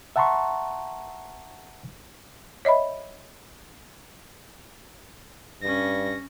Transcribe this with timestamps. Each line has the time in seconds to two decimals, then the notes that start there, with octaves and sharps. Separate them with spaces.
0.16 E5 F#5 A5 A#5 C6 C#6
2.65 C#5 D#5 E5 B5
5.62 G2 C#4 A#6